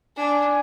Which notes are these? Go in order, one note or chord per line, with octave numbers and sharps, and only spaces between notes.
D4 G#5